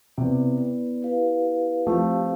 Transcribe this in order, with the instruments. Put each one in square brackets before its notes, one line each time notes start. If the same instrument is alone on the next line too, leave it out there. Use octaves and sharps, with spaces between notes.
[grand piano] C3 [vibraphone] B3 E4 B4 D5
[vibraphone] E4 G4 B4 F5
[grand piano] F3 A3 [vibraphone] C4 G4 C5 F5